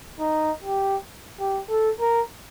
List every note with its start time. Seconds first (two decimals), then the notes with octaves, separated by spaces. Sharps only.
0.20 D#4
0.64 G4
1.40 G4
1.69 A4
2.00 A#4